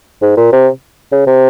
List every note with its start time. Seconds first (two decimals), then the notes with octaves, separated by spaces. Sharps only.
0.22 G#2
0.37 A#2
0.52 C3
1.12 C#3
1.26 C3